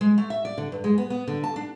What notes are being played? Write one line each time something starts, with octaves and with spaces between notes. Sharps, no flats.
G#3
A3
E5
D5
D3
G2
G#3
B3
B3
D3
A5
D4